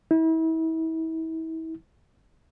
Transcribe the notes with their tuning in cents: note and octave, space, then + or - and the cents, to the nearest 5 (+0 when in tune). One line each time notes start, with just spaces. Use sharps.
E4 -35